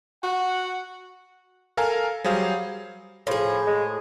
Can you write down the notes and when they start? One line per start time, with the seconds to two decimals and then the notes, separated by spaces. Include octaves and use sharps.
0.23 F#4 F#5
1.77 A4 A#4 F5 G#5 A#5
2.24 F#3 G3 G#4 C5 F5
3.27 A2 F3 G#4
3.67 G#3